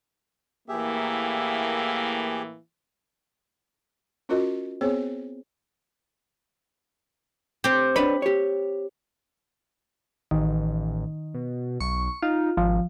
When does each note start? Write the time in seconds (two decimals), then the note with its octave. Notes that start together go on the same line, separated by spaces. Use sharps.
0.69 A2 E3 A#3 G4 G#4 E5
4.29 C#4 F4 F#4 A#4 D#5
4.81 B3 C4 G#4 C5 C#5
7.64 C4 G4
7.96 D4 B4 C#5 B5
8.22 G4 C#5
10.31 A1 D#3
11.34 B2
11.80 B1 C#6
12.23 D#4 F4
12.57 G#1 F3